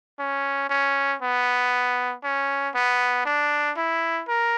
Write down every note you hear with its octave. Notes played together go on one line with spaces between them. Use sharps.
C#4
C#4
B3
C#4
B3
D4
E4
A#4